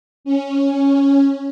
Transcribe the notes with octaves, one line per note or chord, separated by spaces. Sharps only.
C#4